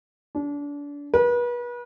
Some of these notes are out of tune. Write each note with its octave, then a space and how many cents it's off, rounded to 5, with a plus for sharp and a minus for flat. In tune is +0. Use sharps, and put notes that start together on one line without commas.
D4 -30
B4 -35